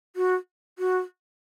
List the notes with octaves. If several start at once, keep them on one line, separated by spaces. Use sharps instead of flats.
F#4
F#4